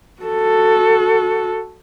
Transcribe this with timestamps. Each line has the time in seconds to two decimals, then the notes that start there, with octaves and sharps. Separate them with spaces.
0.22 F#4 A4